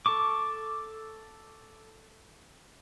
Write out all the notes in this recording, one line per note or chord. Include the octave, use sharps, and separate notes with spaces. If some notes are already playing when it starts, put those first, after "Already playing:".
A4 A5 C#6 D6